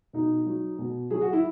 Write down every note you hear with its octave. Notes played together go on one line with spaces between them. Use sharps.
B2 D#4
F#3
B2
F#3 G#4
F#4
E4